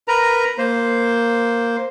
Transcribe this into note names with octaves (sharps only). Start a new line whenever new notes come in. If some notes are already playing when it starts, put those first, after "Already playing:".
A#4 B4 A#5
A#3 C5